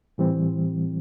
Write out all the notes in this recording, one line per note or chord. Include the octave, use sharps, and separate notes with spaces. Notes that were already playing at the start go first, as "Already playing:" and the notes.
A2 E3 G3 C4